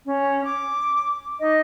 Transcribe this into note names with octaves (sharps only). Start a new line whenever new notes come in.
C#4
D6
D#4 D#5